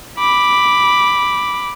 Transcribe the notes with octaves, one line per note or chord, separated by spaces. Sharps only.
B5 D6